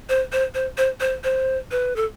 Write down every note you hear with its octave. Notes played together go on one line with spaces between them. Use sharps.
C5
C5
C5
C5
C5
C5
B4
A4